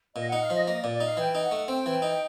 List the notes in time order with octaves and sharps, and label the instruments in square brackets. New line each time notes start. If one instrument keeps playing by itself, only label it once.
[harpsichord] A#2 [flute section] D#5
[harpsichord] D#4 [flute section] F#5
[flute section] F5
[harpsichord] F3 [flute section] D#5
[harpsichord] A#3 [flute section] D#5
[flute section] D5
[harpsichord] A#2
[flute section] D5
[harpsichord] D#4 [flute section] F5
[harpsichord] E3 [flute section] G5
[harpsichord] D#4
[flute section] F#5
[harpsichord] A3
[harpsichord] C4 [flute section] G5
[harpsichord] E3
D#4